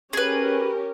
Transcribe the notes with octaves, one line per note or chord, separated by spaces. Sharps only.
C#4 G4 G#4 A#4 B4